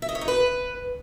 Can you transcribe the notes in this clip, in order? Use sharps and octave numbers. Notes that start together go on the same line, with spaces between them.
E5
D#5
C#5
D#4
B4